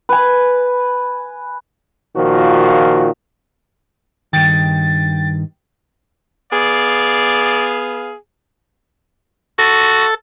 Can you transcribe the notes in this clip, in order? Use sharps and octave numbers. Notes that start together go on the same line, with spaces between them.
B4 G#5
A#2 D#3 F3 F#4
G2 D#3 G5 A6
B3 G#4 D5 F5
F#4 A4